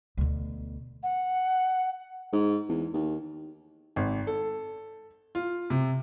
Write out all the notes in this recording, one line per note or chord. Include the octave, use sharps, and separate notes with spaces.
D2 B2
F#5
G#2
E2
D#2
G#1
A4
F4
C3